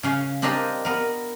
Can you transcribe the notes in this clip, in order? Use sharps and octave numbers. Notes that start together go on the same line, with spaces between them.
C#3 C#4 F5
C4 D4 G4 A#4 D#5 F5
B3 A#4